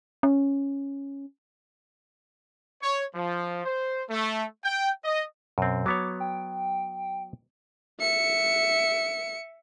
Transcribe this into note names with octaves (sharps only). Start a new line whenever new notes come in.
C#4
C#5
F3
C5
A3
G5
D#5
F#2 B2 C4
F#3 B3 C#5 D6
G5
E5 C#7